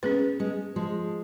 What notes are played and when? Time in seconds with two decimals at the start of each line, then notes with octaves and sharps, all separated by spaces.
0.03 G#3 B3 C#4 G#4 B4
0.39 G#3 B3
0.76 F3 G#3